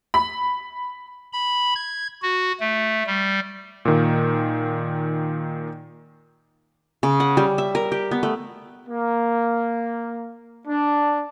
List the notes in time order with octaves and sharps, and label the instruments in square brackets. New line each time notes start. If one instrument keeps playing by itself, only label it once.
[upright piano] B5
[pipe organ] B5
G#6
F#4
A3
G3
[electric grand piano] A#2 D#3
[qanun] C#3
F#5
G3
E5
A#4
G4
B3
A3
[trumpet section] A#3
D4